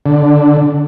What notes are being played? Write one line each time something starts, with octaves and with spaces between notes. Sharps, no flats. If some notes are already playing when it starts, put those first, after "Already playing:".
D3